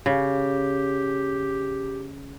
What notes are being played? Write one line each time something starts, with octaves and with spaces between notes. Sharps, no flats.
C#3 G4